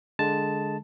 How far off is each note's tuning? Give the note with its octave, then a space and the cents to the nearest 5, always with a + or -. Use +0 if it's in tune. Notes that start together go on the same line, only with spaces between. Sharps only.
D3 +0 G#3 +10 A5 +0